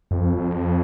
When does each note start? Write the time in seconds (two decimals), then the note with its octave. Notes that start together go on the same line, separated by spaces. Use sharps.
0.11 F2
0.37 F2